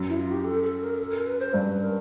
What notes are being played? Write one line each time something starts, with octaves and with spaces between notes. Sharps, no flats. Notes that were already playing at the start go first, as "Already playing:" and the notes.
Already playing: F#2
E4
F4
G4
A4
A4
A#4
A4
A#4
B4
C5
G2 B4
A#4